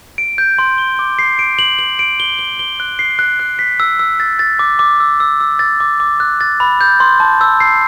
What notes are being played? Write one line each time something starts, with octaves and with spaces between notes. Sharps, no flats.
D7
G6
C6
G7
D6
C7
D7
F#7
F#7
D7
G7
G7
G7
F#6
C7
F#6
F#6
B6
E6
E6
A6
A6
D6
D6
E6
E6
E6
A6
D6
D6
F#6
A6
B5
G6
C6
A5
E6
C7